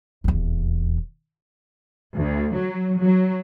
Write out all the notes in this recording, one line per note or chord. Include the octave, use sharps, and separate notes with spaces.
D#1 E2
D2
F#3
F#3